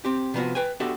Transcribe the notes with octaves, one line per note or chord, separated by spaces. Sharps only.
C4 G4
C3 F3 B3 D4 F4 F#4
B4 G5 G#5
B3 D4 F#4 G4 A4 E5